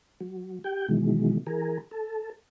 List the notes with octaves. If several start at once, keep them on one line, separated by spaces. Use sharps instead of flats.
F#3
G4 G5
B2 D#3 E3 F#3 G#3
E3 G#4 A#4
A4